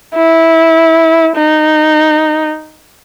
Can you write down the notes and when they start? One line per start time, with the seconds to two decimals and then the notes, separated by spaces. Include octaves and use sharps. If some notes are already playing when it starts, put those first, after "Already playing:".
0.15 E4
1.36 D#4